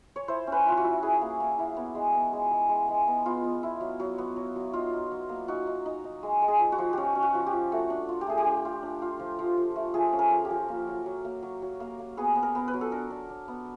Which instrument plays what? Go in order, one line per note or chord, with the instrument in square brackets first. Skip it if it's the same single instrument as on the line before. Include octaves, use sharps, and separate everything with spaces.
[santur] C#5
E4 C5
C#4
B4
E4 F4
F#4
E4
E4 G#4
A#3
A#3
E4
B3
G#3
B3
G#3
G#3
G#3
G#3
B3
B3 F4
B3
E4
F#3
F#3
B3
F#3
F#3
D#4 F4
D#4
F#3
A#3
D#4 F#4
D#4
D#4
D#4
G#3
G#3
G#4
F3
F#4
F3
C#4 F#4 G4
C#4
F#4
F3
G4
F3
A3 F#4
D4
F4
G4
A3 G#4
G4
D4
F4
D4
F4
F3
F3
F3
A3
F3 G#4
C#4
A#4
F3
G4
F3
A#3
F#3
F#3
A#3
F#3
F#3
A#3
A#3
B3 G#4
B3
A#4
B3
B4
F#3
A4
D4 A#4
D4
D4
B3